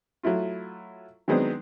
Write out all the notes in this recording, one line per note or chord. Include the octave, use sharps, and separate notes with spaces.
F#3 A3 E4 F4
D#3 F#3 G#3 B3 C4 D4